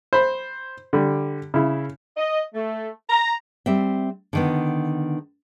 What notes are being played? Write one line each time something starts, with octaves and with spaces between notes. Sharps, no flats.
C5 B5
D3 G3
C#3 E4
D#5
A3
A#5
G3 C4 E5
D3 D#3 B3